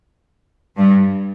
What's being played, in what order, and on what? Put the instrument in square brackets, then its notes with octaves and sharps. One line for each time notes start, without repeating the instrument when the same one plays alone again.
[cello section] G2